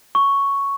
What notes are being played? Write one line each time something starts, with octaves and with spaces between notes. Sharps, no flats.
C#6